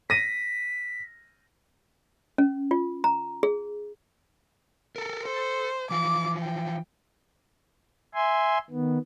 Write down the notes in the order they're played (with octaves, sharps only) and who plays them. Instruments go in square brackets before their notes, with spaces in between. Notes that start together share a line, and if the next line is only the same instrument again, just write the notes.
[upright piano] A#6 D#7 [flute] B6
[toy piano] C#4
F4
A#5
G#4
[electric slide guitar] A4 A#4
[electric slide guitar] A4 [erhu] C5
[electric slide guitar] E3 F3 [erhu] D6
[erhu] G5
[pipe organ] E5 G#5 C6
D#3 B3